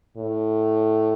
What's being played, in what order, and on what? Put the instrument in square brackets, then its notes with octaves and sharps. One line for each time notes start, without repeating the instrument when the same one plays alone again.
[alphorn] A2